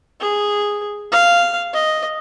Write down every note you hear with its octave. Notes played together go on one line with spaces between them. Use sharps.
G#4
F5
D#5